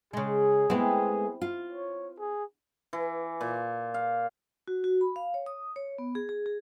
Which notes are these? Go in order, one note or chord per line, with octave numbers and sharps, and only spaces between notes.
C#3 G#3 G#4
G#3 A3 B3 C4 E4
F4
C#5
G#4
E3
A#2
F5
F#4
F#4
B5
F5
C#5
D#6
C#5
B3
G#4
G#4
G#4